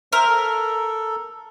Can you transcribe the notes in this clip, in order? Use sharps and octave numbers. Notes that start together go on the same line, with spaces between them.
A#4 C5 E5
A4